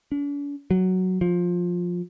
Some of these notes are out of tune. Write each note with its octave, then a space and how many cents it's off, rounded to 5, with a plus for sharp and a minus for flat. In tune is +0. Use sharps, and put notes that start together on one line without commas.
D4 -45
F#3 +5
F3 +15